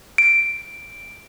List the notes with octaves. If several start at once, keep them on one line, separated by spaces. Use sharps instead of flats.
D7